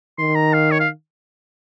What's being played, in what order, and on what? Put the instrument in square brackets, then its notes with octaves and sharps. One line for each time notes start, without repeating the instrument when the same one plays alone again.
[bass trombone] D#3 [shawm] C6
[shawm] A#5
F5
C#5
F5